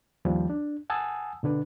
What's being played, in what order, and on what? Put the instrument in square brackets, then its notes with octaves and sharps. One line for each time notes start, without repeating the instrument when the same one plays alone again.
[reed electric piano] D#2 F3 G3
D4
F#5 G#5 A5 D#6 E6
B2 D3 D4 B4